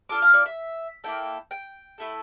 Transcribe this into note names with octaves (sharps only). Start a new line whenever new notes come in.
D4 F4 A4 D6
F5
D5
E5
A#3 E4 A4 G5
G5
A3 E4 A4